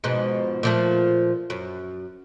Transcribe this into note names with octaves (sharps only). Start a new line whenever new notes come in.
G#2 B2 F3
A#2 F3 A3
F#2